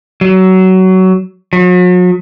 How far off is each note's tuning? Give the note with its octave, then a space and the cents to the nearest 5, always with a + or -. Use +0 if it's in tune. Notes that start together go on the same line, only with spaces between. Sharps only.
F#3 +20
F#3 -40